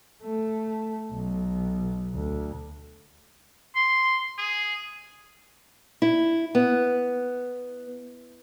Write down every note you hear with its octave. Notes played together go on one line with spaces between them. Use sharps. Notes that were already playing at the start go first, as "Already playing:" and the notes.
A3
B1
D2
C6
G#4
E4
B3